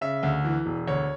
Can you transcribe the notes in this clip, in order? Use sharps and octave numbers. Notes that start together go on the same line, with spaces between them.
C#3 E5
D2
E3
E1
D2 C#5